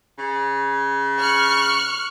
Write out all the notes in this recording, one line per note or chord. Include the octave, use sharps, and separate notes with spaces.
C#3
C#6 F6 F#6